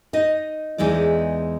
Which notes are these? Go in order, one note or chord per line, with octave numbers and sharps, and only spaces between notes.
D#4 D#5
E2 E3 G#3 D#4 D5